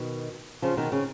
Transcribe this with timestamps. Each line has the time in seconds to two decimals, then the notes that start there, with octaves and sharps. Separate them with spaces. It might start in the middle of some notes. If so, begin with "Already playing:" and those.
Already playing: B2 D#3
0.62 C#3 F3
0.77 B2 D#3
0.92 C#3